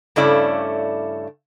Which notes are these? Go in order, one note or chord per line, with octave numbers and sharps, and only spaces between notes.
G2 C#3 A3 C#4 E4 D5